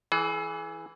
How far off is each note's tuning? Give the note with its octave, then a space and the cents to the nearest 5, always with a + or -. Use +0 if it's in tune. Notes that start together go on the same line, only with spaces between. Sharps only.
E3 +0 G#4 +40